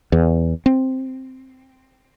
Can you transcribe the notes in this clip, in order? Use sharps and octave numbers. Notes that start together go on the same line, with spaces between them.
E2
C4